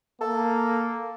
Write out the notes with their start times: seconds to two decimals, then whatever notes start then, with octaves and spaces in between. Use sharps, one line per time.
0.21 A#3 A4